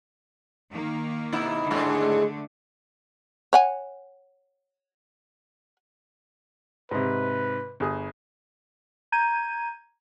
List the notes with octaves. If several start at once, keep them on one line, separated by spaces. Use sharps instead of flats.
D#3 A#3
B2 D#4 E4
D#2 G#2 D3 G#3 A3
C#5 F#5 G#5
G#2 C3 B4
G1 G#4 D#6
A#5 G6 G#6 D#7